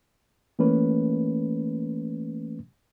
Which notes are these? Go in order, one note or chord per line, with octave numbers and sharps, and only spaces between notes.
E3 A3 A#3 C#4 B4